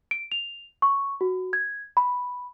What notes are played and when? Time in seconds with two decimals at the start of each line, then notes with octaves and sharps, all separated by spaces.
0.11 D7
0.32 F7
0.82 C#6
1.21 F#4
1.53 G#6
1.97 B5